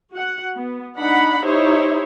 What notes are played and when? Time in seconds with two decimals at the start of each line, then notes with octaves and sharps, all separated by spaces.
0.11 F#4 F#5
0.56 B3
0.97 D4 D#4 F#5 B5
1.44 D#4 E4 G4 C5 C#5